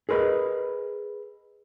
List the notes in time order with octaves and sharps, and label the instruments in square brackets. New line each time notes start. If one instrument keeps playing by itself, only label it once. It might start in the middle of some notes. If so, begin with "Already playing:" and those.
[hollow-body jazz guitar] G#4 A#4 B4 D#5